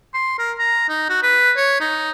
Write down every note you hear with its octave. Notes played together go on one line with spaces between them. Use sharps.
C6
A#4
A#5
D#4
F#4
B4
C#5
D#4